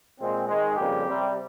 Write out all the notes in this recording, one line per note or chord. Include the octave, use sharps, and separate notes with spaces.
A#2 G#3 C4
G#2 D#3 G#3
F2 C#3 G3 A#3 G4
C3 G3 C4